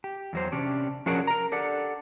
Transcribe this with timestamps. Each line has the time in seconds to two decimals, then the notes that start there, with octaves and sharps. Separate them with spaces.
0.04 G4
0.33 E2 F#3 C5
0.52 C3 C#4 D4 G4
1.06 F3 C#4 D4 F#4 G#4 A#4
1.27 A#4 A#5
1.52 D4 G4 A4 D5 F#5